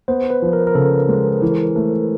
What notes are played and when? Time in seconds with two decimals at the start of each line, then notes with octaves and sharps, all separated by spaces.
0.08 B3 C5
0.30 B4
0.42 F3
0.53 A#4
0.67 A#4
0.75 C#3 A4
1.08 G#3
1.42 E3
1.76 A3